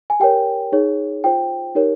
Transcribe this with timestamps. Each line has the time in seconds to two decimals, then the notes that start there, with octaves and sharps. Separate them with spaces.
0.10 G#5
0.20 G4 A#4 C#5 G5
0.72 D#4 G#4 C#5
1.24 F4 C5 G5
1.75 D#4 G4 A#4 C#5